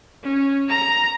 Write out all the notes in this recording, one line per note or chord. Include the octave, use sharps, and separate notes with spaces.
C#4
A#5